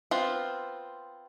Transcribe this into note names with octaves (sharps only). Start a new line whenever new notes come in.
B3 C4 F4